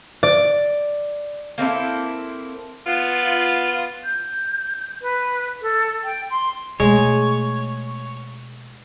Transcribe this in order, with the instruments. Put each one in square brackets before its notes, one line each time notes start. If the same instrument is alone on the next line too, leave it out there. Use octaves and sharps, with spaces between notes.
[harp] D5
[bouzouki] A#3 C4 E4 A4
[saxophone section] B3 F4
[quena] G6
B4
A4
G5
C6
[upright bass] B2 A3 [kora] G#3 [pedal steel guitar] C#5